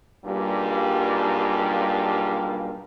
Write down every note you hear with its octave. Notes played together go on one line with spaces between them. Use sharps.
B1 G2 G3 A#3 F4 G#4